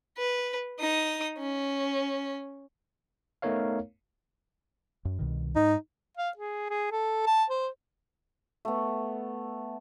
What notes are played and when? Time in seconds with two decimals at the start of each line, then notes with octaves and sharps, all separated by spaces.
0.18 B4
0.79 D#4 D#6
1.38 C#4
3.42 A3 B3 D#4 A#4 C#5 F5
5.05 F#2
5.19 C2 B2 D#3
5.56 G#2 D#4
6.17 F5
6.37 G#4
6.70 G#4
6.92 A4
7.27 A5
7.50 C5
8.65 A3 B3